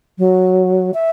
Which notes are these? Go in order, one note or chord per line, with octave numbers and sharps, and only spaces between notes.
F#3
E5